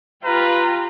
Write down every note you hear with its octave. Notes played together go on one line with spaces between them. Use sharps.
F4 G4 B4 A#5